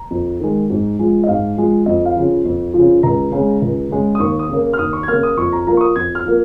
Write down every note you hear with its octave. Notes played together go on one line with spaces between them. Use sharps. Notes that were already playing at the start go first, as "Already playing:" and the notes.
Already playing: A#5
F2
D#3 G#3
G#2
F3 G#3
D#5
G#2 F5
F3 G#3
F2 D#5
F5
C#3 F3
F2
C#3 F3
C#2 A#5
C#3 G#3
C#2
C#3 G#3
D#6
D#2 C#6
D#6
C#3 A#3
F6
D#2 D#6
C#6
G#6
C#3 A#3 F6
D#6
F2 C#6
A#5
F3 A#3 A#5
C#6
D#6
F2 G#6
F6
F3 A#3